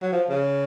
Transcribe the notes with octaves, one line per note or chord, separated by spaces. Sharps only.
F#3
F3
C#3